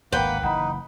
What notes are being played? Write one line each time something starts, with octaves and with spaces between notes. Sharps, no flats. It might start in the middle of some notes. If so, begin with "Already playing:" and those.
G#1 D2 A#3 B4 F#5 G5
F#1 E3 D#4 F#5 B5